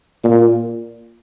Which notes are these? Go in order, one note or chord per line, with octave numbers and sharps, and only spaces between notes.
A#2